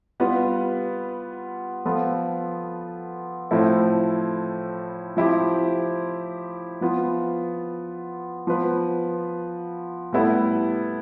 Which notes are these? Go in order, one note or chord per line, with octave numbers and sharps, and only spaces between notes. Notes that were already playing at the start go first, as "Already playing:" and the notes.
G3 B3 F4 B4
F3 B3 F4 A4
A2 F3 C4 E4 A4
F3 C4 E4 G4
F3 B3 F4
F3 B3 F4 B4
A2 G3 B3 E4 A4